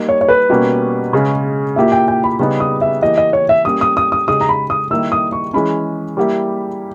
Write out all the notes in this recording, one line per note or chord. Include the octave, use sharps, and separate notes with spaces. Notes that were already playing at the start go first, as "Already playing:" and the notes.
Already playing: G3 A#3 D#4
C#5
C#5
B4
B2 G3 A#3 C#4 G4
C#3 G#3 C#4
A#2 A#3 E4 G4 E5
G5
G5
B5
C#3 G3 B3 D#4
D#6
E5
E3 A#3 E4 G4 D#5
D#5
C#5
E5
G3 A#3 C#4 G4 D#6
D#6
D#6
D#6
C#3 G#3 D#4 G4 D#6
A#5
B5
D#6
D#3 G3 A#3 E4 G4 E6
D#6
C#6
E3 G#3 C#4 B5
G3 A#3 E4 G4